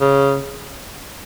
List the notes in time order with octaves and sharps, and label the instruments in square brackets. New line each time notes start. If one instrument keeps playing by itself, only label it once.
[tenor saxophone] C#3